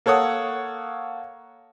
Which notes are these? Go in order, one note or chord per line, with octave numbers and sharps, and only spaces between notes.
A#3 A4 C#5 F#5 D#6